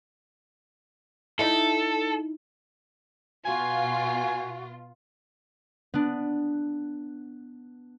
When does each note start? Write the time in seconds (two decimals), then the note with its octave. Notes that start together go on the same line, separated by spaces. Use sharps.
1.39 D#4 E4 A4
3.46 B2 F4 F#4 G#5
5.94 B3 D4